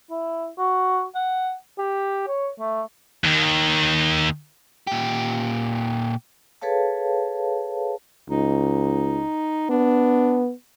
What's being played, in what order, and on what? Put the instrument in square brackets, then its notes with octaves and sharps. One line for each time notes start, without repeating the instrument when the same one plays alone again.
[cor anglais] E4
F#4
F#5
G4
C#5
A3
[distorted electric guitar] D#2 D#3
[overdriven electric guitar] A#2 G4
[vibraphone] G#4 A4 B4 C#5 F5 A5
[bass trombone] C#2 [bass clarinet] D#4
[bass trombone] B3 [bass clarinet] D4